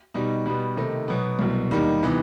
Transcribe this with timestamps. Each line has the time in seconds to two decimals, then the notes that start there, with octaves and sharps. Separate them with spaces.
0.14 B2 G3 D#4
0.46 B2 G3 B3
0.77 C3 D#3 A3 C4 D#4
1.08 B2 F#3 B3
1.39 C2 B2 F#3
1.71 D#2 D#3 G3 D#4
2.03 C3 E3 B3 D#4